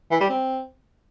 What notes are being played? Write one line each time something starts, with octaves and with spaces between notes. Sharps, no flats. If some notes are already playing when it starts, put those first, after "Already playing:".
E3
G3
C4